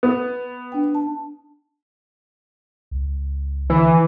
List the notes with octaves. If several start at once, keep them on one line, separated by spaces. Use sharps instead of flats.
B3
D4 G5
A5
C#2
D3 E3